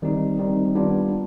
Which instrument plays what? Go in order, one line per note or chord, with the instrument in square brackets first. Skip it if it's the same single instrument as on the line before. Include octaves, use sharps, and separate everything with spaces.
[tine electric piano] D#3 G3 C4 D#4
D#3 G3 C4 D#4
G3 B3 D4 F4